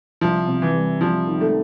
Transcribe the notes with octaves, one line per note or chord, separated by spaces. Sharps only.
C2 F3
C3
E3
G3
F3 G3
D#3
A3